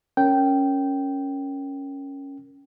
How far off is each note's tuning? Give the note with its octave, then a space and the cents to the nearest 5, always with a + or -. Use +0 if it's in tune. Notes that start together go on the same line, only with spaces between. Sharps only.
C#4 +0 A#4 -5 G5 -10